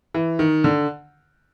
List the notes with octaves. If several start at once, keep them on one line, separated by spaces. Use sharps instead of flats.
E3
D#3
D3